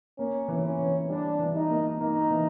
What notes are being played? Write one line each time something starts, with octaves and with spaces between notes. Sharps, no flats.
A#3 C#4
E3
C#4
E3
G3 D4
E3
D#4
A#3
A#3 D#4
E3